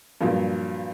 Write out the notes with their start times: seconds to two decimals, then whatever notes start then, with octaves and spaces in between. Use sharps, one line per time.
0.21 G2 A#2 F3 F#3